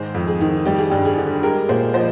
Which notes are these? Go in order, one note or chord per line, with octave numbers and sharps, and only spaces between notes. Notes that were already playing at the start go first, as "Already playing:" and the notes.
Already playing: G#2 D#3 G#3 G#4 C5
F2
G#4
D#3
G3 G4
G#4
G2 G4
G#4
D3
G#3 G4 A#4
A#2 G#4 C5
F3 C5 D#5